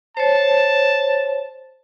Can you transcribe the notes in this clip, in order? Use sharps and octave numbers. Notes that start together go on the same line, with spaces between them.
C5 C#5 A5